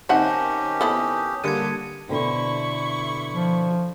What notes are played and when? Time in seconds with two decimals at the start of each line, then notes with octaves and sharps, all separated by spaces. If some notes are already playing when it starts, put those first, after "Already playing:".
0.09 D#3 C4 C#4 D#4 G4 E5 F#5 A5
0.81 B3 E4 A4 D#6
1.44 D3 G3 A#3 D4 A4 G#6 C#7 D#7
2.09 B2 D3 C4 E4 C#6
3.34 F3